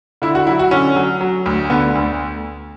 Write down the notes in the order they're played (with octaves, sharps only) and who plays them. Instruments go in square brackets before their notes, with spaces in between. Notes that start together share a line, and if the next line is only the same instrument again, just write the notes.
[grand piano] D3 E4
F#4
F#3 E4
F#4
D3 C#4
F#3
F#3
D2
D3 B3
D2